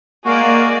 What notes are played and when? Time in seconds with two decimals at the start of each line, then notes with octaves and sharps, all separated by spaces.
0.25 G#3 A#3 F#4 D5